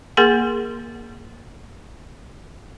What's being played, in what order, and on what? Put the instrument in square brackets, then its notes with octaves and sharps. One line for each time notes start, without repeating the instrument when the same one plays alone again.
[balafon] A#3 G#4 A#4 F#5 C6